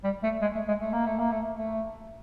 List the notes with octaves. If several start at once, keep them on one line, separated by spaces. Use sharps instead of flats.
G3
A3
G#3
A3
G#3
A3
A#3
A3
A#3
A3
A3